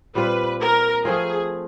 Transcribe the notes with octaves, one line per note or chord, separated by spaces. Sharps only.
A#2 G3 C4 F4 B4
A#4
F3 A3 C4 F4 G#4